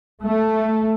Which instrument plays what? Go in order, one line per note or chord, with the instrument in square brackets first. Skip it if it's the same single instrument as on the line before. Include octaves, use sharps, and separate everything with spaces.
[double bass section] A3